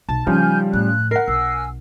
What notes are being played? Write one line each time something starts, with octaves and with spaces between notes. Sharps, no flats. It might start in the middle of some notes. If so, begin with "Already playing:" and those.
B1 A5
C#3 F3 G3 D#4 G#5 F6 G6
F2 A2 F#6
A#4 F#5 C7
B1 G#5 E6